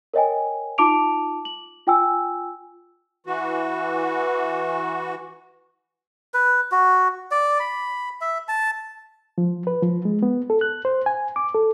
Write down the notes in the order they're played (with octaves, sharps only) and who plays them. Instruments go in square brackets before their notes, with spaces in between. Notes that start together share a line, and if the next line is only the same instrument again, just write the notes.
[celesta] A#4 C#5 D#5 G5 G#5
D#4 F4 A5 D6 D7 F7
F#7
F4 G5 G#5 E6
[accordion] E3 F#4
[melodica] B4
F#4
D5
B5
E5
A5
[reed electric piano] F3
B4
F3
G#3
B3
A4
F#6
C5
G#5
D6
A4